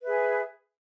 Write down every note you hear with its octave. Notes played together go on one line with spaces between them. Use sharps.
G#4 B4 E5